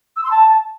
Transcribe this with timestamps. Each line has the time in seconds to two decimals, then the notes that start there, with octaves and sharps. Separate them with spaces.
0.16 E6
0.23 C6
0.30 A5